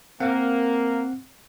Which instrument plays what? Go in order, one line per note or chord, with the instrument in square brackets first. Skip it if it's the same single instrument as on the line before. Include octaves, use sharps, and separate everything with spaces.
[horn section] A#3 [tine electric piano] C4 F#5